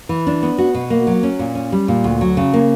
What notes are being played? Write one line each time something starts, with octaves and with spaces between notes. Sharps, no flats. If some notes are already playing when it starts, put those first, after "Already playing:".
E3
D4
B3
F#4
B2
A#3
F#3
C#4
A#2
C#4
G3
A#2
D2
F#3
C#3
A#3